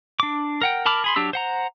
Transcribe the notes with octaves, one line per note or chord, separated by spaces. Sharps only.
D4 D6
A#4 F#5 G5
A#4 A5 B5 D6 F6
G#4 B5 C6
F#3 D4 G4 E6
C5 F#5 A#5